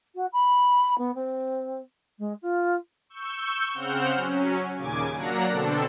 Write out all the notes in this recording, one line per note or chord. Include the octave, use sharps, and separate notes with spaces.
F#4
B5
B3
C4
G#3
F4
C#6 E6 G6
C#3 C4 F#5 F6 G6 E7
F#3 C#4
D#2 A#2 C#3 G#5 D6 G#6
F#3 A#3 D4 F#5 A#5 A#6
B2 D3 C4 D4 A4